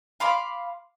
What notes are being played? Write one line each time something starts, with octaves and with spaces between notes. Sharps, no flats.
F5 B5 C6 D6